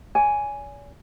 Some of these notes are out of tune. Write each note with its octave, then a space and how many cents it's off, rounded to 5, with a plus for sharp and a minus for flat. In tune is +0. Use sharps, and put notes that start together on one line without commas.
D5 -45 G#5 +0